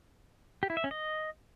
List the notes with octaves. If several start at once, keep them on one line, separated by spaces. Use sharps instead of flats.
G4
E4
E5
C#4
D#5